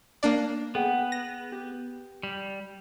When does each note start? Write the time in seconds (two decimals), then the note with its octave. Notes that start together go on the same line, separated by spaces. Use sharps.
0.23 A#3 D4 D5
0.75 B3 G#4 F#5 G5
1.12 A#6
1.52 G4
2.23 G3